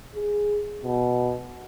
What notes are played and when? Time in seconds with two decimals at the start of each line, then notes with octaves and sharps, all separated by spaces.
0.15 G#4
0.84 B2